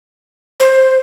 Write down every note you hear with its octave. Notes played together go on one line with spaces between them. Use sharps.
C5